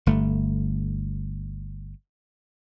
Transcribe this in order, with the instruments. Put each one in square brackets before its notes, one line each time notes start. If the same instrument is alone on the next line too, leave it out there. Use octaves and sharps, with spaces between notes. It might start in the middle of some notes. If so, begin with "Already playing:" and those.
[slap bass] G1 A3